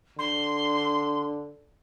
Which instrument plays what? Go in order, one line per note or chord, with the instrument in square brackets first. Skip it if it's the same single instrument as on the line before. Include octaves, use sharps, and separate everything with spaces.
[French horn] D3 [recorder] C6